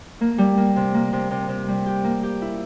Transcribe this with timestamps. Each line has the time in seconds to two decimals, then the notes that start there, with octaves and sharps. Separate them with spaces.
0.21 A#3
0.38 G3
0.57 A#3
0.76 C3
0.94 A#3
1.13 C3
1.31 C3
1.49 C3
1.68 G3
1.86 G4
2.04 A#3
2.23 G4
2.42 E4